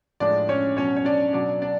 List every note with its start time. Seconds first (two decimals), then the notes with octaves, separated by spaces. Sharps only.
0.20 A2 F3 G#3 D4 D5
0.49 C#4 C#5
0.77 B2 F#3 C#4 C#5
0.96 C#5
1.05 D4 D5
1.33 B2 F#3 D4 D5
1.62 D4 D5